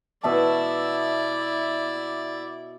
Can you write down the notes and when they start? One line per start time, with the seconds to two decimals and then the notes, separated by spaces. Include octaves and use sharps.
0.23 B2 E4 D5 E5 A5